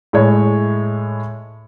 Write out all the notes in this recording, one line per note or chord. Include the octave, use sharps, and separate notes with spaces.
A2 G#3 C#5